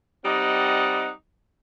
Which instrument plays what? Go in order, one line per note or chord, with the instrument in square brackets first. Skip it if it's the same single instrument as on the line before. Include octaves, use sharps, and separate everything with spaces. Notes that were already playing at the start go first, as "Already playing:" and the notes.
[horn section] G3 C4 D#4 D5 D#5 F#5